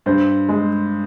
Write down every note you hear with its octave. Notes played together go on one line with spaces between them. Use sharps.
G2 C5
G#3